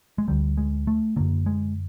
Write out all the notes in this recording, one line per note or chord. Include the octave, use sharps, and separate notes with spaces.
G#3
D2 D3 G3
G#3
A3
F#2 D3 A#3
G#3